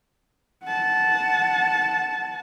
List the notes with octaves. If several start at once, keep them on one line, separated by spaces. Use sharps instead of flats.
F#5 A5